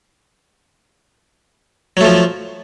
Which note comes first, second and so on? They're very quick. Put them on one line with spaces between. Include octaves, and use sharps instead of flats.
F#3 A3 F3